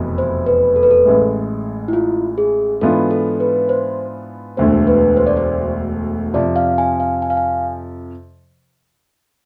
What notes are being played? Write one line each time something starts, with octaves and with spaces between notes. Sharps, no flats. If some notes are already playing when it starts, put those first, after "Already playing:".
Already playing: F1 E2 B2 B3
C5
B4
A4
B4
A4
A1 A2 G#3
E4
F4
G#4
G#2 E3 B3 D4 F4 A4
A4
B4
C5
E1 D2 D3 A3 C5
B4
C5
D5
C5
F2 C3 F3 D5
F5
G#5
F5
G#5
F5
G#5